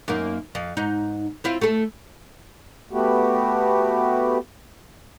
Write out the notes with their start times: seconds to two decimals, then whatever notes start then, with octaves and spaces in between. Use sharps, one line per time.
0.08 F#2 A#3 D#4
0.55 F2 F5
0.77 G#2 D#4
1.44 C4 E4 F4
1.61 A3 A4
2.91 A3 B3 F#4 G4